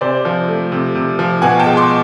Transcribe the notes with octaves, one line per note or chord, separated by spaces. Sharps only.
C3 C5 D5
F3
A3
C3
C3
F3
B2 F#5 G#5
G5 A5
G#3
C6 D6